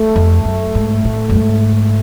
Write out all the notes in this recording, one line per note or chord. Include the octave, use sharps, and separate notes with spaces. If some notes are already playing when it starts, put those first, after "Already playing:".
Already playing: A3
F2
F#2
G#2
A2
F#2
G#2